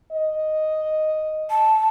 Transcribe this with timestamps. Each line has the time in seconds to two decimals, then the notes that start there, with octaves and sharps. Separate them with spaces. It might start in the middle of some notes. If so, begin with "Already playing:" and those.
0.12 D#5
1.50 A5